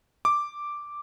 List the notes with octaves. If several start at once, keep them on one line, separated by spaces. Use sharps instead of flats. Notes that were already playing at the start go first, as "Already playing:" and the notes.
D6